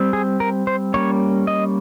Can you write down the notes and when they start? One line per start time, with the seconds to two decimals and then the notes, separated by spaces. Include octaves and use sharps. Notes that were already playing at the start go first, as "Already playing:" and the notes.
Already playing: G3 C4
0.13 G#4
0.40 A#4
0.67 C5
0.94 G3 A#3 C#4 C#5
1.47 D#5